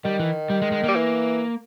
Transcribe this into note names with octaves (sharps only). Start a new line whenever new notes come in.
D#3 G3
E3
G3
G#3
G#3
G3 A#3
E3